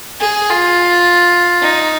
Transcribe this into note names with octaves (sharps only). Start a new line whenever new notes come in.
G#4
F4
D#4